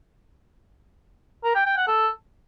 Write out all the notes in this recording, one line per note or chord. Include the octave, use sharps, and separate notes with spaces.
A#4
G5
G5
F#5
A4